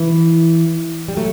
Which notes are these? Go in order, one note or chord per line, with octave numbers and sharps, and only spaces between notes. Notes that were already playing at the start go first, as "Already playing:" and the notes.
Already playing: E3
G3
F#3 A3